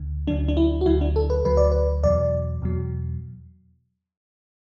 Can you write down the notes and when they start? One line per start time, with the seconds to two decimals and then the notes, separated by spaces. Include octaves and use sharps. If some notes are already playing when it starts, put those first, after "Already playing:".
Already playing: D2 D3
0.27 D2 D3 F#3 D4
0.48 D4
0.57 E4
0.81 F#4
0.86 D2 D3 F#3 E4
1.01 D4
1.16 A4
1.30 B4
1.45 D2 D3 F#3 B4
1.57 D5
1.72 B4
2.03 E2 B2 F#3 D5
2.62 E2 B2 F#3